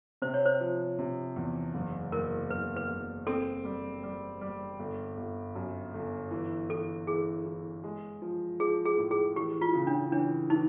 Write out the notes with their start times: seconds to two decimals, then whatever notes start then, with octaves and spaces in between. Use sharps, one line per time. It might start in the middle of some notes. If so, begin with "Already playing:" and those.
0.22 C3 C5
0.34 C#5
0.46 C5
0.60 F3
0.99 C3
1.36 E2
1.74 F#1
2.12 F#1 A#4
2.50 F#1 B4
2.76 B4
2.89 F#1
3.27 C4 A4
3.64 G3
4.03 G3
4.41 G3
4.79 G1
5.17 G1
5.55 F#2
5.94 G1
6.31 E3
6.69 E3 A4
7.07 E3 G#4
7.46 E3
7.83 G#3
8.22 F3
8.60 F3 G#4
8.85 G#4
8.98 A2
9.11 G#4
9.36 E3 G4
9.61 F4
9.74 C#3
9.87 D4
10.12 E3 D4
10.50 E3 D#4